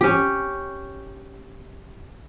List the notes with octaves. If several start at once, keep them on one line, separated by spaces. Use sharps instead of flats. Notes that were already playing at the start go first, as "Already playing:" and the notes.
C#4 G4